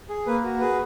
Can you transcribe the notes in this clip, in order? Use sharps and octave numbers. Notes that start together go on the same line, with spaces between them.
G#4
A#3 B4
F#4
G#4 B4